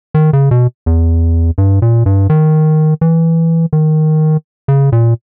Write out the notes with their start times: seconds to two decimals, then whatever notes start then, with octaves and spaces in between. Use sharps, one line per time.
0.14 D#3
0.33 C#3
0.51 B2
0.86 E2
1.58 G2
1.82 A#2
2.06 G2
2.30 D#3
3.01 E3
3.73 D#3
4.68 C#3
4.92 A#2